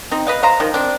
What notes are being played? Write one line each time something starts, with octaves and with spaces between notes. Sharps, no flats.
C4 D#4
B4 D#5 F5
C5 F5 A#5
D#3 F3
C4 D4